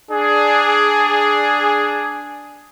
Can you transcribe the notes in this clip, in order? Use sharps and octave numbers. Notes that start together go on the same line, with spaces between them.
D4 G#4